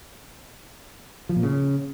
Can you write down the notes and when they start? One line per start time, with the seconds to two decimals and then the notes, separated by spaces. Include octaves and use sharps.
1.29 F3
1.36 A#2
1.43 C#3